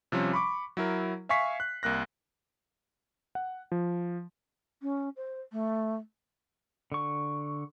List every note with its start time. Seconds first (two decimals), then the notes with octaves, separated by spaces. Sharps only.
0.12 C3 F3 G3 C#4
0.33 B5 C#6 D6
0.77 F#3 E4 A#4
1.29 E5 F5 G#5 C#6 B6 C7
1.60 F#6
1.83 C2 A#3 F#6 A#6
3.35 F#5
3.72 F3
4.82 C#4
5.17 C5
5.52 A3
6.92 D3 C#6